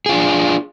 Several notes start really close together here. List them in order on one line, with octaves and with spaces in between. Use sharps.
G#4 F4 D4